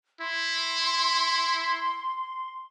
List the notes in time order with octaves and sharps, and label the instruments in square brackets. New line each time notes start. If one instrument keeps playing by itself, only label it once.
[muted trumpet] E4 [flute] C6